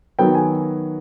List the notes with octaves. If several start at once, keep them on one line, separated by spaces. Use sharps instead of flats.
D#3 F#3 B3 G5
G#5